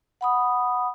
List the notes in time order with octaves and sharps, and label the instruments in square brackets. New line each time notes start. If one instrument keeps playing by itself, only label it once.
[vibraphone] F#5 B5 D#6